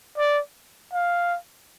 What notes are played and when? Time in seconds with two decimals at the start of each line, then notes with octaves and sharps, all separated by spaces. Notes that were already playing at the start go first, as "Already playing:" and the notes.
0.18 D5
0.93 F5